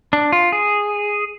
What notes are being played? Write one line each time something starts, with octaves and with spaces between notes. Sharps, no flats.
D4
F4
G#4